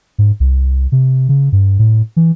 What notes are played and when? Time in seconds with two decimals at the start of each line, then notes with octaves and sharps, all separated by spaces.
0.18 G#2
0.40 C2
0.92 C3
1.29 C#3
1.52 G2
1.79 A2
2.16 E3